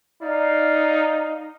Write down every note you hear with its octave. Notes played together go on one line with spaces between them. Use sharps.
D#4 D5 F5